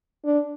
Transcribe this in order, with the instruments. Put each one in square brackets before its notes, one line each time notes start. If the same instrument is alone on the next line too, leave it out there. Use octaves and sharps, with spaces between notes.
[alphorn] D4